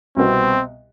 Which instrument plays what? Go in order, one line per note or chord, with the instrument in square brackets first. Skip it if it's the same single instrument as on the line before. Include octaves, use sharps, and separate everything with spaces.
[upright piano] C2 B2 B3 [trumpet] C4